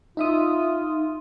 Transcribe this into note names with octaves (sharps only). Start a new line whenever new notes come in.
D#4 F4 E5 D#6